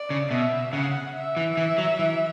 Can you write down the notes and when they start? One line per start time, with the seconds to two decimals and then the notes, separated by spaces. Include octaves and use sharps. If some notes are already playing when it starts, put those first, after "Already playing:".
Already playing: D5
0.10 C#3
0.31 B2 E5
0.73 C#3 F#5
1.15 E5
1.37 E3
1.57 E3
1.78 F#3
1.99 E3